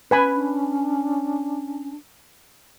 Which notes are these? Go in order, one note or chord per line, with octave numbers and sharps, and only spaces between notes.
C#4 B4 G#5 B5
D4